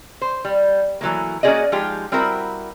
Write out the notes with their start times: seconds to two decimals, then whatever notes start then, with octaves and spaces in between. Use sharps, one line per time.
0.21 C5
0.45 G3
1.01 E3 F#3 A3 A#3
1.43 A#3 C#4 F#4 G#4 D5 D#5
1.72 F3 G#3 D#4 F4 G4
2.12 G3 C4 E4 F#4 A#4